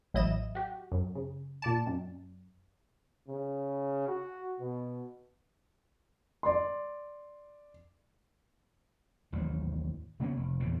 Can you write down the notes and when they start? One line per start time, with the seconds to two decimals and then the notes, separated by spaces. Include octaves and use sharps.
0.14 A1 F#3 E4 D#5 D#7 E7
0.55 F#4 G4
0.92 F#2
1.15 C#3
1.62 A#2 D5 A5
1.86 F#2
3.28 C#3
4.08 F#4
4.60 B2
6.43 D5 C6
9.32 A1 D#2 G#2 F#3
10.20 C#3 A#3 B3 C#4
10.37 F1
10.60 E2 A#2 C#3